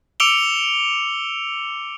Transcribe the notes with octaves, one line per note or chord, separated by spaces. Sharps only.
D6 E6 C#7 D7 F7 G7